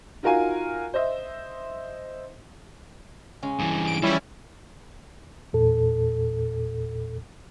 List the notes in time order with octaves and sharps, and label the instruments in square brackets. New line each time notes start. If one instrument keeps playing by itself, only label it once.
[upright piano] D#4 F4 F#4 A#4 F5 G#5
C5 D#5 E5
[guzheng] C#3 G#3 C#4
[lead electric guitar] G2 E3
[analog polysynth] D7
[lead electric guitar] E3 F3 [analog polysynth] G3 C#4 E4
[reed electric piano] E2 A#2 A4